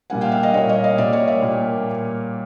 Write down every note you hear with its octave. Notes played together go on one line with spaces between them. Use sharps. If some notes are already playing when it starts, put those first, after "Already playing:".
A#2 G3 A#3 F#5 G#5
F5 G5
E5 F#5
D#5 F5
A#2 G3 A#3 C#5 D#5
C#5 D#5
D#5 F5
A#2 G3 A#3 D5 E5
C#5 D#5
D5 E5
A#2 G3 A#3